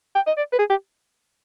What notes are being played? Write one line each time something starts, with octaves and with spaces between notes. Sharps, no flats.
G5
D#5
D5
B4
G#4
G4